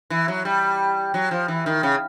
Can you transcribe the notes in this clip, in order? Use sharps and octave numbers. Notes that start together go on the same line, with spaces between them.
E3
F#3
G3
F#3
F3
E3
D#3
C#3